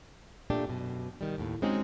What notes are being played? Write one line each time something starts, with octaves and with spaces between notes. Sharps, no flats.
A#2 A3 D4 G4
F#2 B2
D#3 G3
D#2 A2
G#3 C4 C#4 D#4 F#4 G#4